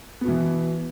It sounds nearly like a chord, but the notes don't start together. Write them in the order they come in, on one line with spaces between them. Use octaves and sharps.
B3 B2 E3